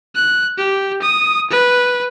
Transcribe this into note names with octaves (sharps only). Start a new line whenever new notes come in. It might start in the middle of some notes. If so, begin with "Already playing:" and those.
F#6
G4
D#6
B4